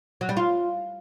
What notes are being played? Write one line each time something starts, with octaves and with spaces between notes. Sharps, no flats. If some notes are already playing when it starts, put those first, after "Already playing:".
F#3
G3
F4